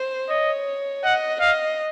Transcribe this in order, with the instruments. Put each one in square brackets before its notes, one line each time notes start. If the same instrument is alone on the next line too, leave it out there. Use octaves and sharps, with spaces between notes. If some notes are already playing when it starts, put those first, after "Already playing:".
Already playing: [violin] C5
[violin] C#5 [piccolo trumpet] D#5
[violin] D#5 [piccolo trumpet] F#5
[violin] D#5 [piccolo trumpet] F5